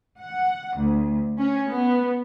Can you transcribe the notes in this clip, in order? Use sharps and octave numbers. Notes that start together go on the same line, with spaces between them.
F#5
D2
C#4
B3